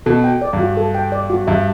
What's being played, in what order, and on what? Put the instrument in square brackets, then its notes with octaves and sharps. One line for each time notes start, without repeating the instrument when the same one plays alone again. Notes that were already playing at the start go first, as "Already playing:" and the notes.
[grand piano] B2 [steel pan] A4
[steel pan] G5
D5
[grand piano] G2
[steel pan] F#4
A4
G5
D5
F#4
[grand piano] G2 [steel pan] E5